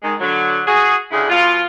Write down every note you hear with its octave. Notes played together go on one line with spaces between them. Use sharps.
D#3 G#3
D3 F#3
F#4 G#4
D2 C#3 D4 E4 G#4
B2 F3 F4